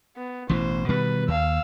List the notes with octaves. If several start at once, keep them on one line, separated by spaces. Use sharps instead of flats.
B3
A1 B2 E3 C5
B2 D#3 G3 B4
D#2 F5 E6